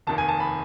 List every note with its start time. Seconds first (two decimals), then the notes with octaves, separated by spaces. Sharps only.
0.07 F1 D#2 D#3 A5
0.18 G#5
0.29 A5
0.40 B5